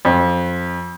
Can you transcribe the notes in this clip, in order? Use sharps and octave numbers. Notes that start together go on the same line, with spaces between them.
F2